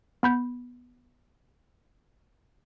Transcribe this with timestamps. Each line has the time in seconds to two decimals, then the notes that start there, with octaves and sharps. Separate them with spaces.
0.23 B3 B5 G6